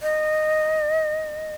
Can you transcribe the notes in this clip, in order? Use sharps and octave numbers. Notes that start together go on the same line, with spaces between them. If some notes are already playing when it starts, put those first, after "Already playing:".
D#5